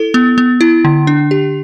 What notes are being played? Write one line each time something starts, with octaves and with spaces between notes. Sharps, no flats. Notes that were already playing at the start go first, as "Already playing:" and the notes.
Already playing: E4 A4
B3
B3
E4
D3
D4
G4